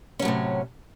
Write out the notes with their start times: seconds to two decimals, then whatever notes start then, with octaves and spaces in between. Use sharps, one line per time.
0.19 C#4
0.22 F#3
0.25 A2
0.28 C3